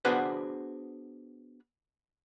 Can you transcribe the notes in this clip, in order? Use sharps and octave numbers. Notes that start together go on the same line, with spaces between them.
B3 D4 F#4 G#4 B4 C5